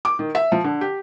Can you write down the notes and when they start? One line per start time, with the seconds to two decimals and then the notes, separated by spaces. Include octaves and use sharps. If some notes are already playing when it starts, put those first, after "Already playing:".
0.05 D6
0.19 D#3
0.35 E5
0.52 F3
0.64 D3
0.81 G4